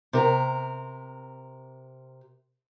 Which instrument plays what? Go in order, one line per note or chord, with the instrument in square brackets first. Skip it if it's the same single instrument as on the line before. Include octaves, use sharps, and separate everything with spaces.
[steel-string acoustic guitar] C3 A#4